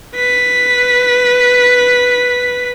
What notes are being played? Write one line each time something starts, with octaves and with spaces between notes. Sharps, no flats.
B4 B6